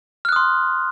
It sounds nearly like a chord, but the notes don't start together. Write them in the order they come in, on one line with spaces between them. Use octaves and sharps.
F6 F#6 D#6 C6